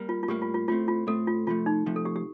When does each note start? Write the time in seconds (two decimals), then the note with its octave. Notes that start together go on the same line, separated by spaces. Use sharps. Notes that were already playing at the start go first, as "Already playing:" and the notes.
Already playing: G3 A#3
0.09 F4
0.23 F4
0.28 A2 G3 A#3 G4
0.42 F4
0.54 F4
0.68 A2 A3 C4 F4
0.88 F4
1.07 A2 A3 C4 A4
1.27 F4
1.47 C3 F3 A3 F4
1.66 D#4
1.86 C3 F3 A3
1.96 A4
2.05 G4
2.16 G4